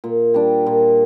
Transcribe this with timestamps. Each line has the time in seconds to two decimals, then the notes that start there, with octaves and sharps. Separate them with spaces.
0.04 A#2
0.34 G3 D4
0.66 A#2